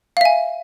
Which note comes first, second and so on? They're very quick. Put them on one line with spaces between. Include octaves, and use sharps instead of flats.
F5 E5 G#5